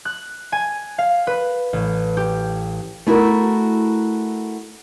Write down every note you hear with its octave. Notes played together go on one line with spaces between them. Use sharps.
F#6
G#5
F5
B4
A1
G4
A3 E4 F#4 A#4